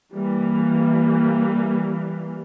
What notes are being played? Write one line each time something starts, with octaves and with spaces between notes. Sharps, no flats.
E3 G3 A#3